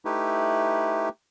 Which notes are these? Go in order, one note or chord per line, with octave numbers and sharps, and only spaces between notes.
A3 D#4 E4 G4 B4